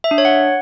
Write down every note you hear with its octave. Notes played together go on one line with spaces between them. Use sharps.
E5
D4
C#5
F#5